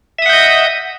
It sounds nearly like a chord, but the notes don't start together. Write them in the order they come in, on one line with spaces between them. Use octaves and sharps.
E5 D#6 F#5 G6 D#5